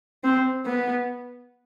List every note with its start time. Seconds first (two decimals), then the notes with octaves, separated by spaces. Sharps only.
0.24 C4
0.66 B3